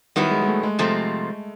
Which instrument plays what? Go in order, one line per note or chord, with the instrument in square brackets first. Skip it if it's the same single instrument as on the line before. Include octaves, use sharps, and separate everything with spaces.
[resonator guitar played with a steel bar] D#3 F#3 B3 E4 [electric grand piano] G3
[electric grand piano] G#3
G#3
A3
G#3
[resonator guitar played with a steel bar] F2 C3 F3 A3 C4